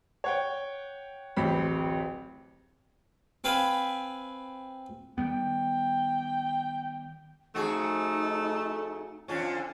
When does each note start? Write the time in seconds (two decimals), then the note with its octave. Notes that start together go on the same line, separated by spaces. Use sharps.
0.24 C#5 F#5 G5
1.37 D1 A1 C4 B5
3.44 C4 B4 F5 G#5 B5
5.18 D#3 G3 B3 G5
7.55 F2 A3 D#4 F#4 G#4
9.28 F2 D3 C#4 F4